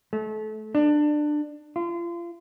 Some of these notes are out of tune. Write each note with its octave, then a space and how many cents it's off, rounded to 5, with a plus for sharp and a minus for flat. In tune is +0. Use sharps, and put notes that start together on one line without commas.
A3 -30
D4 +20
F4 -30